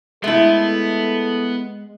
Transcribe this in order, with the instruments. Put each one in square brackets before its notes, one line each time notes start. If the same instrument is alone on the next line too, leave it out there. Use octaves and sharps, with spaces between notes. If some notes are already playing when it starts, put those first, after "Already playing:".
[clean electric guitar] G#3 [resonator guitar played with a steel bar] A3 E4 [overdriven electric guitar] B3 [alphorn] A4